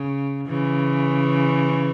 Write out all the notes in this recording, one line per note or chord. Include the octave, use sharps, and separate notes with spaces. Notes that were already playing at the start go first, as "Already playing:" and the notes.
Already playing: C#3
C#3 E3